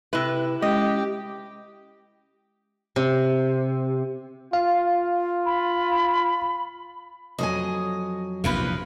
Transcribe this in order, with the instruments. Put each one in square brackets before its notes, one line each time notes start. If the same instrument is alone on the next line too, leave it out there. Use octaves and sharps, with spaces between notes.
[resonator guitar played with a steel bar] C3 B4 [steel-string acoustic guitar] E4
[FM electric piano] G#3 C#4 [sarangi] G4 [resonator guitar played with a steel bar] D#5
[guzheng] C3
[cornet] F4 [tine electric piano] F5
[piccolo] B5
[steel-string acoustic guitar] F2 F#3 G#5 [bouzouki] D#5
[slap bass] A#1 E2 C3 [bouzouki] F4 A#4 B4